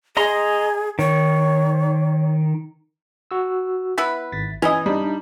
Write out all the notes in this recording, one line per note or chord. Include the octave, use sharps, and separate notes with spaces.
G#4 D#5 A#5 C6
D#3 C#5
F#4 E6
B3 E4 B4
G#1 A6 B6
E3 C#4 E4 D#5 G#6
G3 D4 D#4